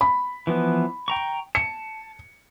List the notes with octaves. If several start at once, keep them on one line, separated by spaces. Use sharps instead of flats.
B5
E3 F3 B3
G5 A#5 C#6
A5 C#7